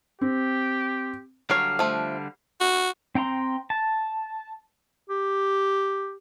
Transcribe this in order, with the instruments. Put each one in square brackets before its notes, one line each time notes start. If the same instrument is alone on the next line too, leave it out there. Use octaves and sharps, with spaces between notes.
[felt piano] C4 [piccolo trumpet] G4
[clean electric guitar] D3 G3 F5 [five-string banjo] F#3 C#5
[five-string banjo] F3 A3
[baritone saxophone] F#4
[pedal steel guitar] C4 G5 A#5 C6
A5
[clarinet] G4